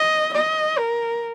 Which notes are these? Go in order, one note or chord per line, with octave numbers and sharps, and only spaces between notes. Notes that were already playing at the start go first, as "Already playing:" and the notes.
Already playing: D#5
D#5
A#4